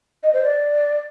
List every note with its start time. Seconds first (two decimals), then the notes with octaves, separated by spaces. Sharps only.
0.23 D#5
0.33 C5
0.43 D5